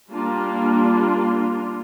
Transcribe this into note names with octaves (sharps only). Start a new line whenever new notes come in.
G3 A#3 D4 F4